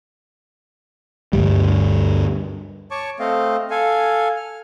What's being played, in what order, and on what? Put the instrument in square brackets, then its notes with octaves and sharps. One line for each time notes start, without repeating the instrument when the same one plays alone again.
[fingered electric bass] D2 G2 G3
[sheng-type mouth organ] C#5 A5 C#6 D6
A3 C4 D#5 F5
A4 F5 G#5
F6